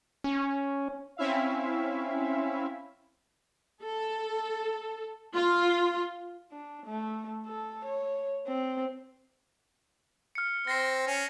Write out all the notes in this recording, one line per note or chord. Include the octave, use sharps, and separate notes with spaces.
C#4
C4 C#4 E4 E5 F5
A4
F4
D4
A3
A4
C#5
C4
F6 C#7
C4 A#6 C7
C#4